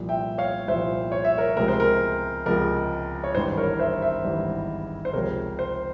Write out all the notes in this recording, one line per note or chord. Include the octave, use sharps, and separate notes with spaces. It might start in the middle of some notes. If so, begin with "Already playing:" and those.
Already playing: C2 A#2 F3
E5 G5
C#5 F5
C2 A#2 F3 C5 E5
C#5
E5
A#4 C#5
C#2 C3 F3 G#3 A#4
C5
A#4
C#2 C3 F3 G#3 A#4
C#5
G#1 G2 E3 G3 C5
A#4 C#5
C5 E5
C5 E5
G#1 G2 E3 G3
C5
C#2 C3 F3 A#4 C#5
C5